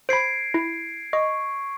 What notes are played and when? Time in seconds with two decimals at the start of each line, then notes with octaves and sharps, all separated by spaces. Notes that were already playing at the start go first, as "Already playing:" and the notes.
0.09 C5 B5 G#6 C7 D7
0.54 E4
1.13 D#5 C#6